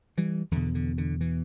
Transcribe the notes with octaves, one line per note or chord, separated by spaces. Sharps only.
E3 G3
E2 B2 D3
D3
D3
E3